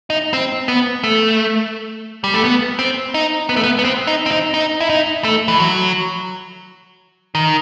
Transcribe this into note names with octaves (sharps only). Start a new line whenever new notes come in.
D#4
C4
B3
A3
G3
A3
B3
C4
D#4
B3
A3
B3
B3
C4
D#4
C4
D#4
D#4
E4
D#4
A3
E3
F#3
D#3